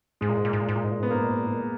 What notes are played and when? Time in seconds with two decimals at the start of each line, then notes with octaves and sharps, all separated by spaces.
0.21 G#2 G#3
0.29 A#2
0.37 G#2
0.45 A#2
0.53 G#2
0.61 A#2
0.69 G#2
0.75 A#2
0.84 G#2
0.91 A#2
1.00 G#2
1.03 B3
1.07 A#2
1.11 G#2 A#3
1.22 A#2
1.30 G#2
1.38 A#2
1.46 G#2
1.53 A#2